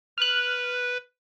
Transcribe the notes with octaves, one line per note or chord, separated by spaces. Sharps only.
B4 F6 F#6